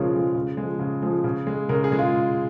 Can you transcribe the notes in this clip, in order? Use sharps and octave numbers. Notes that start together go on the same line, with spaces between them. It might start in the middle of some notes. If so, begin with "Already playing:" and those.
Already playing: C#3 F3 G#3 F4 G#4 A#4 C#5
F3 G#3
C#3
F3 G#3
C#3
F3 G#3
C#3
G#3
C#3 A#4
G#4
G#3
F4